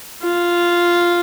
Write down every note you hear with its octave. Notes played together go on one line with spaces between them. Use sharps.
F4